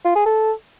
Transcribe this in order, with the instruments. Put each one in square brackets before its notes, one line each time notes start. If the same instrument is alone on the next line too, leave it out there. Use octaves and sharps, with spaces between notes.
[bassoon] F4
G#4
A4